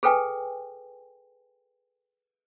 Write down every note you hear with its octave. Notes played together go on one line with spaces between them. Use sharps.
G#4 A4 B4 G5 G#5